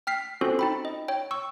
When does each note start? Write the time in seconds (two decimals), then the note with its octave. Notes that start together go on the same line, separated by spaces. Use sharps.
0.07 G5 F6 B6 C7
0.41 C4 C#4 F4 F#4 A4 C5
0.59 D#4 G5 B5
0.85 D#5
1.08 C#5 G5
1.31 C#6 E6